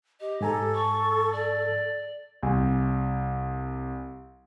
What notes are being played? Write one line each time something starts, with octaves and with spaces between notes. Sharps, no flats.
G4 D#5
G#2 A4 G#5 A#5
C#6
D5
C2 G#5